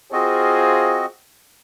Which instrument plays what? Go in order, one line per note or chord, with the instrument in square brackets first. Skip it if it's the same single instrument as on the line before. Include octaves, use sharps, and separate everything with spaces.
[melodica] C4 F#4 D#5 [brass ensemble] F4 G#4 C5